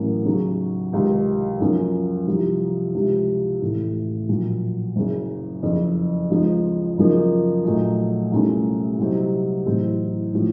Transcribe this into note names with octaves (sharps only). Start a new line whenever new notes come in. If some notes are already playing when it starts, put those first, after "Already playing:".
Already playing: A1 A2 F#3 A#3 C#4
D#2 C#3 F#3
C#2 C3 D#3
F#2 F3 A#3 C#4
C2 C3 F3
C#2 C3 F3
A1 A2 A3
A#1 A#2 F#3
F#1 F#2 C#3
F#1 F2 C#3
C#2 C#3 F3 C4 D#4
F#2 C#3 F3 A#3 D#4
A#1 A#2 F#3 A3 D#4
C2 A#2 A3 C#4
C2 C3 F#3 C4 D#4
A1 A2 F#3 C4 D#4
A2 F3